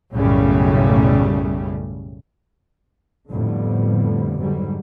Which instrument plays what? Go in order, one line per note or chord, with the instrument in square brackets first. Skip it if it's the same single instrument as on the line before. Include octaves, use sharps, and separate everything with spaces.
[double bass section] B1 F#2 A2 C#3 G3 A3
F2 A2 D3 F3 G3 B3
G#2 D3 F#3 G3